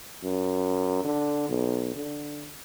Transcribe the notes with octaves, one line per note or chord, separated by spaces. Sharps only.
F#2
D3
B1
D3